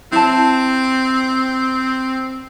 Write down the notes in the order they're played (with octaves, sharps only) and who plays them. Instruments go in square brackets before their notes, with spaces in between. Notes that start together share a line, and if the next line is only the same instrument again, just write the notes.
[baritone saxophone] C4 [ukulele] E4 A5